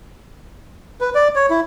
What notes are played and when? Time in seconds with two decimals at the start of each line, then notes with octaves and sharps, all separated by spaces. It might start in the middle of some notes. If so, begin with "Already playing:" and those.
1.01 B4
1.15 D5
1.35 C#5
1.50 E4